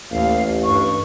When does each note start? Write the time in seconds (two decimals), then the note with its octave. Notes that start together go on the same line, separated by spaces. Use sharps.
0.12 A1 D#2 F5
0.64 G2 C#6